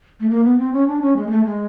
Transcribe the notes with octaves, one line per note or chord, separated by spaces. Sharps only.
A3
A#3
B3
C4
C#4
D4
C#4
G#3
A#3
A3
G#3